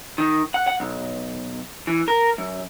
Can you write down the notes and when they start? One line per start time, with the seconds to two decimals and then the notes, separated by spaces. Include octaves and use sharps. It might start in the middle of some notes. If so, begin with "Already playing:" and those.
0.18 D#3
0.54 F#5
0.67 F#5
0.80 B1
1.87 E3
2.08 A#4
2.38 F#2